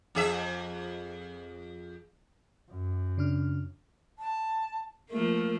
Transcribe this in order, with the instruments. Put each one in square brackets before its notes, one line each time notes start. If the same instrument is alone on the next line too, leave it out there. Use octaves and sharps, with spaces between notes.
[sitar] F2 G#4 E5
[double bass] F#2
[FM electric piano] C#3 D4 F6
[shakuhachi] A5
[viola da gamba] F3 A3 A#3 [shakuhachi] A#4